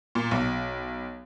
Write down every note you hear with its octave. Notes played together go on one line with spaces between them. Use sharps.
A#2
B1